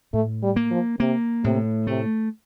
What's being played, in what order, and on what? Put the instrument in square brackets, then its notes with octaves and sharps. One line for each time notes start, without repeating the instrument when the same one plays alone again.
[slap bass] A2 [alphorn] A3
[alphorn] G3
[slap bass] A#3
[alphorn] F3
[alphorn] C3 [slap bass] A#3
[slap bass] A2 [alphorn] C3
[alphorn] C3 [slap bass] A3